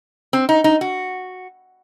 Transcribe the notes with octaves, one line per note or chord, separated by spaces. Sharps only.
C4
D#4
D#4
F#4